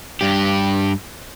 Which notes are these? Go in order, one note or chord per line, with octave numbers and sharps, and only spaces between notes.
G2 G4